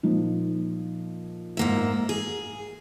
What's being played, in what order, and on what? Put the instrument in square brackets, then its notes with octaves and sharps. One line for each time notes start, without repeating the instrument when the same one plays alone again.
[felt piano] A#2 F3 D#4
[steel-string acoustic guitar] G#2 A#3 E5
G#4